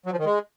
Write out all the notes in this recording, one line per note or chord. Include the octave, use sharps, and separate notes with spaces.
F#3
F3
D#3
G#3